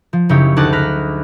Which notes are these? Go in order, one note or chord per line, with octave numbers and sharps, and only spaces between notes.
F3
F#1 C#3 D#4 E4 G4 C#5
D2 D#4 G#4 A5 D6 F#6
B5 F6 F#6 A#6